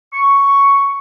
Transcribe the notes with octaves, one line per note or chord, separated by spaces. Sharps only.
C#6